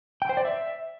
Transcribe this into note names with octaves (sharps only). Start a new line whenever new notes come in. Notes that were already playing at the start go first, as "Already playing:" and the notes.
G5
C5
D5
E5